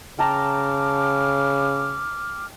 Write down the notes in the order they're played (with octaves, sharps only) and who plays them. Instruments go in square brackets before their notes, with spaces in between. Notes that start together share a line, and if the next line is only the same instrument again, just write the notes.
[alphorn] C#3 [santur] G5 A5 A#5 [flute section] D6 F6